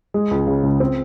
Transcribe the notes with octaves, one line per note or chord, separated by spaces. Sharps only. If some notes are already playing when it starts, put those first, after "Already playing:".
G#3
C#2
C#3
C#2
C4